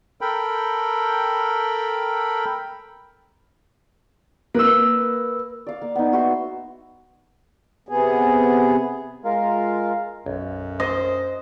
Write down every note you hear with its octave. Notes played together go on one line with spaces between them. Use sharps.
A4 A#4 G5 B5
A#3 B4 E6
D5 F5
A#3
B3 D#4
F#4 E5 C6
C3 B3 G#4
G#3 F4 A#4 F5
B1 F#2
C5 D#5